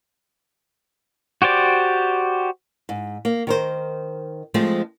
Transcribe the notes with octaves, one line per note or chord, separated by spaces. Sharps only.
F#4 G4 C5 D5
G#2
A#3
D#3 A#4 C5
F3 G#3 A3 C4